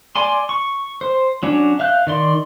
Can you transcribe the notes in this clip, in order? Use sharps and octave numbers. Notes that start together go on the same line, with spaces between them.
D5 G#5 C6
C#6
C5
F#3 C#4 D4
E5 F5 F#6 G6
D#3 D5 C6